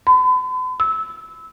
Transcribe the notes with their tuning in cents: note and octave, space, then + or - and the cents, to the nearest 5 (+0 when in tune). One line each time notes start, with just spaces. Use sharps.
B5 +45
E6 -20